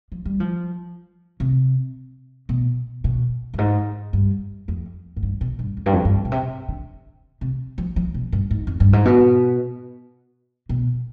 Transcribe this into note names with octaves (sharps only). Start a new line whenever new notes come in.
F3
G3
F3
C3
B2
B2
G2
G#2
G2
F2
G#2
G2
B2
G2
F2
G2
F2
G2
B2
C3
D3
C3
F3
F3
B2
G2
G#2
F2
G2
G#2
B2
B2